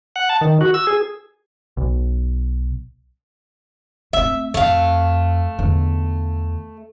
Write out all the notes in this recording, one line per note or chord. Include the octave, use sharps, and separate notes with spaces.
F#5
A5
D#3
F#4
E6
G#4
B1
A3 C4 E5
F2 A3 F5
E2 D3